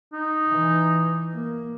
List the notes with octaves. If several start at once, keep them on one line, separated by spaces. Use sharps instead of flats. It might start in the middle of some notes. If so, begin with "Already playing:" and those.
D#4
E3
A#3